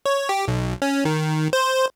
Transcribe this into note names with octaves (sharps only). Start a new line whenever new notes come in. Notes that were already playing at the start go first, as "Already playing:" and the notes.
C#5
G4
B1
C#4
D#3
C5